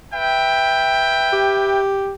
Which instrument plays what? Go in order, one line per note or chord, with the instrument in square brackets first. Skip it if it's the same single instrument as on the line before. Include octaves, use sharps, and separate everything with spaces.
[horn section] B4 E5 G5
[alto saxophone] G4